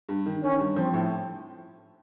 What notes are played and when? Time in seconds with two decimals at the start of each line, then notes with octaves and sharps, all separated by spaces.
0.09 G2
0.26 D#3
0.43 D#3 C#4
0.60 G2
0.76 F3 C4
0.93 A2